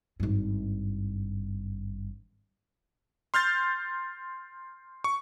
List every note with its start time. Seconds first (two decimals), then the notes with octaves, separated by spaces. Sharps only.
0.20 G#1 G2
3.34 C6 F6 G6 A6
5.04 C#6